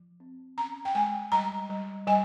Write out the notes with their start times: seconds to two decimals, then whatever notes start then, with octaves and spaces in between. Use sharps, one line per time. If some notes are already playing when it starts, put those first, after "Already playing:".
Already playing: F3
0.20 C4
0.57 C#4 A#5
0.85 G5
0.95 G#3 G#5
1.32 G3 A#5
1.70 G3
2.07 G3 G#5